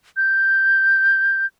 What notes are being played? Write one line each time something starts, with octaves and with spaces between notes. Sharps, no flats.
G6